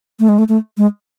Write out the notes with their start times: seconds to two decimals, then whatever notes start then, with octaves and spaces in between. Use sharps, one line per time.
0.20 A3
0.29 G#3
0.39 A3
0.49 A3
0.78 G#3